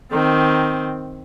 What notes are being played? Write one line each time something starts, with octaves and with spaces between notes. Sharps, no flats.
D#3 C4